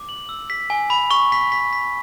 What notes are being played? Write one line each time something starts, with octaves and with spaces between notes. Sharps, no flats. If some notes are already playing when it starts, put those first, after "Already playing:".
Already playing: D6
F#7
E6
B6
G#5
B5
C#6
B6
B6
B6